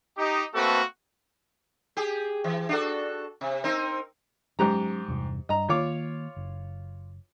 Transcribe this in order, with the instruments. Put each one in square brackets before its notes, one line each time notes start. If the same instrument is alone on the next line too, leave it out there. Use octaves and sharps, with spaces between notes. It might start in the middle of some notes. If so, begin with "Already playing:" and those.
[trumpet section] D#4 G4
A3 A#3 C4 F#4 A4 B4
[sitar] G4 G#4
E3
D4 F#4 A4
C3
C4 D#4 A#4
[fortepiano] G#2 G4 A#5 [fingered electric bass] F#3 C#4
[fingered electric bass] E2 G2 C3
[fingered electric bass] G2 [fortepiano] D#5 A#5
[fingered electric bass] D#3 A#3 [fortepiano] F4 C#5 D6
[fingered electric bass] F#1